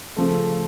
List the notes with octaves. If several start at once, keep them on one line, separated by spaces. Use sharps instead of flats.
C#3 F3 A3